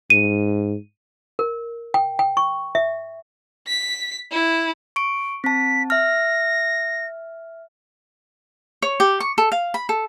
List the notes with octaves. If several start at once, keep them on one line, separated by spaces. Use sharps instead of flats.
G#2 D#7
A#4
G5
G5
C#6
E5
B6
E4
C#6 D7
C4 A5 B6
E5 F6 A#6
C#5
G4
C#6
A4
F5
B5
A4